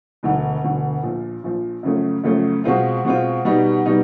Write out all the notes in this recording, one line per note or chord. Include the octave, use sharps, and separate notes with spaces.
E1 D2 D3
E1 D2 D3
A#1 A#2 F3
A#1 A#2 F3
F#2 C#3 F3 A3
F#2 C#3 F3 A3
B2 G#3 C4 F4
B2 G#3 C4 F4
B2 G3 B3 D#4
B2 G3 B3 D#4